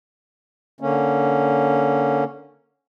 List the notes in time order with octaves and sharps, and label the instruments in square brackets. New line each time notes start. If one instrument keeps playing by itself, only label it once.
[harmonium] D3 A#3 C#4